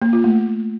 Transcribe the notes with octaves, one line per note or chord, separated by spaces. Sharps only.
A#3
F4
A3